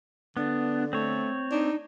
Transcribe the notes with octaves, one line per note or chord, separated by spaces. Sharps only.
D3 B3 D4
A3 C4 C#5
D4 D#4